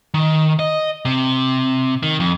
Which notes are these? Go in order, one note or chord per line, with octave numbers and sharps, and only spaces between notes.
D#3
D#5
C3
D#3
F2